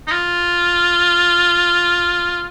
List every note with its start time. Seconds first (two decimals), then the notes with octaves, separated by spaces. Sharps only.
0.07 D#4
0.12 F4